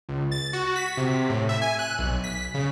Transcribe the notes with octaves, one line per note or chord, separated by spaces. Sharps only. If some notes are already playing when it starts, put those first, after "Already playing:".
C#2
A6
F#4
B6
C3
A2
E5
G#5
F#6
B1
B6
C#3